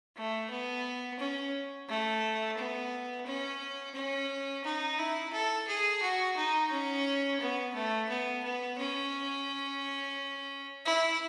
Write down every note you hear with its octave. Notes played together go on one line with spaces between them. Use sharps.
A3
B3
C#4
A3
B3
C#4
C#4
D#4
E4
A4
G#4
F#4
D#4
C#4
B3
A3
B3
B3
C#4
E4